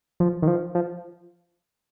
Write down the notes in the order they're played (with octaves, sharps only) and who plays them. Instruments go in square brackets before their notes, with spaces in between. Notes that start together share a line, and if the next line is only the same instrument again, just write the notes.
[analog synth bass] F3
D#3
F3
F3